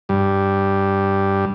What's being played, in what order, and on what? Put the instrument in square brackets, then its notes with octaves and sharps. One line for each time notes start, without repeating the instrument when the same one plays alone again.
[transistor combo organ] G2